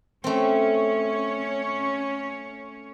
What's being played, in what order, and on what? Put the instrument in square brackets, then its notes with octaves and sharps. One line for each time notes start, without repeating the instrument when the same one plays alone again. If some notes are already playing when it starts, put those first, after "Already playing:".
[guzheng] A3 C4 [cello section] C#4 C#5